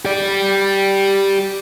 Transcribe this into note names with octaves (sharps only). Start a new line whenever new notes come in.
G4 D5